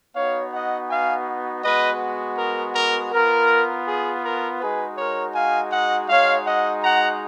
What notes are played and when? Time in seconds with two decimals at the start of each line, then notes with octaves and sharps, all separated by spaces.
0.15 B3 D#4 F#4 C#5 F5
0.53 D#5 F#5
0.90 F5 G#5
1.64 G#3 B3 F#4 B4 D#5
2.38 A#4
2.76 A#4
3.12 B3 F4 A#4
3.87 G#4
4.24 A#4
4.61 G#3 D#4 F#4 G#4 B4
4.98 A#4 C#5
5.34 F5 G#5
5.71 D#5 F#5
6.09 G#3 D#4 F#4 C#5 F5
6.46 D#5 F#5
6.83 F#5 A#5